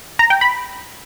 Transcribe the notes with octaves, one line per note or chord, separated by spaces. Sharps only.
A#5
G5
B5